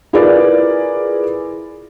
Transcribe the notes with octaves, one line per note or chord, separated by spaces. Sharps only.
E4 F4 G#4 A#4 B4 D5